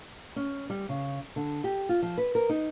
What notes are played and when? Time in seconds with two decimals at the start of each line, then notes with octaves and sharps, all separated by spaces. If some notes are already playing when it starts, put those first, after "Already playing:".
0.36 C#4
0.70 G3
0.89 C#3
1.36 D3
1.64 G4
1.89 F4
2.02 F3
2.18 B4
2.35 A#4
2.49 D#4